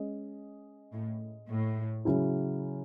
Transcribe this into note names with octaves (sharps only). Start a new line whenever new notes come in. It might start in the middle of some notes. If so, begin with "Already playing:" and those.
Already playing: G#3 C#4 G#4 D#5
A2
A2
C#3 F#3 C#4 E4